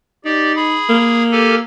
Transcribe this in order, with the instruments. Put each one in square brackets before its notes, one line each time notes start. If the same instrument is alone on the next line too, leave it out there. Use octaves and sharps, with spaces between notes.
[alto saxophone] D#4 [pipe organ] G4 D5
[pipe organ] G#4 B5
[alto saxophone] A#3
[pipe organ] G4 A4 G#5